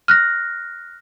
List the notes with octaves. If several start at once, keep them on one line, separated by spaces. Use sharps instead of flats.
F6 F#6 A#6